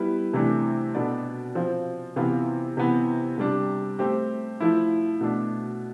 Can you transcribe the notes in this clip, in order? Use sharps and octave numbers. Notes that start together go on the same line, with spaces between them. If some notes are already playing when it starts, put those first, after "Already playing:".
Already playing: G3 B3 E4 B4
C3 E3 A3 D4 A4
B2 B3 D4 A4 D5
F3 C4 F4
C3 E3 B3 F4
C3 E3 B3
C3 G3 D4
A3 C4 G4
F3 A3 E4 A4
B2 A3 D4